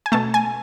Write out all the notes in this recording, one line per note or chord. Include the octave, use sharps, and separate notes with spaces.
G#5
B2 A3 A5
G#5